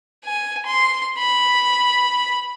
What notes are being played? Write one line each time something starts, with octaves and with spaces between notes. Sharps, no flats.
G#5
C6
B5